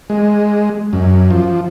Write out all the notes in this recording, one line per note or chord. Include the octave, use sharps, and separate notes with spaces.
G#3
F#2
F3